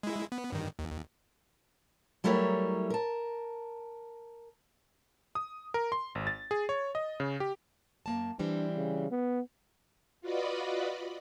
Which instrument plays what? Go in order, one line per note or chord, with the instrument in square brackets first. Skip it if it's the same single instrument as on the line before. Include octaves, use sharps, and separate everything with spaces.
[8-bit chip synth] G#3 E4
B3
G2 D#3
D#2
[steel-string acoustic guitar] F#3 G3 A3 E4 A#4 C#5
A#4 A5
[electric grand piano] D#6
A#4
C6
G#1
A6
G#4
C#5
D#5
C#3
G4
[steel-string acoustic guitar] F#2 A#3 A5
[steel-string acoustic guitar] E3 G3 C4 [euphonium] D4
[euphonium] C#3
B3
[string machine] F4 F#4 B4 D5 D#5 B5